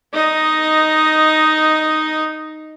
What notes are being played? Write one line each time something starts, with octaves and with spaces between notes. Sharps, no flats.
D#4 D#5